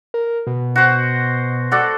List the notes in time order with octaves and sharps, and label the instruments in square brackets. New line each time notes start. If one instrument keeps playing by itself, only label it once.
[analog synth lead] A#4
B2
[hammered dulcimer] F#4 C5
F#4 A4 D5